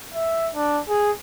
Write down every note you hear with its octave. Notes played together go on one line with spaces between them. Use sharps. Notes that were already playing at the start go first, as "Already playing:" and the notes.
E5
D4
G#4